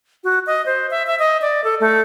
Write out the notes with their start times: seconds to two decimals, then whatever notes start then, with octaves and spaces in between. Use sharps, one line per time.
0.24 F#4
0.46 D#5
0.66 C5
0.90 E5
1.07 E5
1.19 D#5
1.41 D5
1.64 A4
1.80 A3